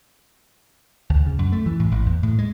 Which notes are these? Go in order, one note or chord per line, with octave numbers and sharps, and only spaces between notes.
D2
C#3
F#2
A3
E3
A2
A1
E2
A2
G#3